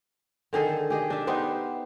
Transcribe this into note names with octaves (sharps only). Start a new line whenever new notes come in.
D3 D#3 G#4 A4
G4 G#4 D#5
D4 E5
B3 D#4 G4 C5